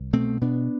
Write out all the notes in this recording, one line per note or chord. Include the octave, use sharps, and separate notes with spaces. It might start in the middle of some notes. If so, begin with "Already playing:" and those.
Already playing: C2
B2 A3 C4
B2 B3 D4